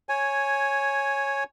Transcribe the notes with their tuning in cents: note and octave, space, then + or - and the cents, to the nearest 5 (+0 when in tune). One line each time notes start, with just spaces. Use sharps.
C#5 -5 G#5 +5